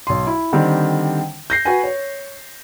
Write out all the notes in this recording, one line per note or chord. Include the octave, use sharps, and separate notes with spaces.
B1 C6
E4
D3 D#3 G3 C4
G6 A#6 C7
F#4 B4 F#5 G#5
C#5